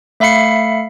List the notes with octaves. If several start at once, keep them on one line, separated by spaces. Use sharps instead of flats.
A3 E5 F5 B5 C7 C#7